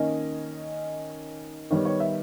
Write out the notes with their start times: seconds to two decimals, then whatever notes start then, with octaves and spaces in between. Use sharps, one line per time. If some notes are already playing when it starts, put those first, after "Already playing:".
Already playing: D#3 A#3 C#4 D#5
1.71 D#3 G3 B3 C#5
1.85 C#5
2.00 E5